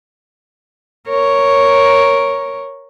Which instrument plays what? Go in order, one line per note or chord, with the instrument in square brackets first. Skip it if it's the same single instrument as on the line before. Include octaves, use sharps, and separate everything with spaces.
[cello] A#4 C#5